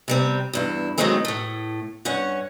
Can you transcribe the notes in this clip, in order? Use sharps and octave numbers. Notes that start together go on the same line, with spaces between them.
C3 G3 C4
E2 G2 E4
D#3 F3 F#3 G#3 A3 C4
A2 A3
G2 C#4 C#5 F#5